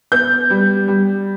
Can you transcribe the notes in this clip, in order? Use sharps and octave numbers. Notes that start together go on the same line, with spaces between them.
B3 G6
G3
G3